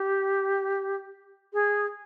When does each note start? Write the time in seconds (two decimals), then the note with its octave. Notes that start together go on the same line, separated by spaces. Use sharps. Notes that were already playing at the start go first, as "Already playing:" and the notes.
Already playing: G4
1.53 G#4